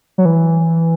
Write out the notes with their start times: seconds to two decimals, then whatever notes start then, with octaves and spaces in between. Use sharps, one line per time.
0.18 F#3
0.25 E3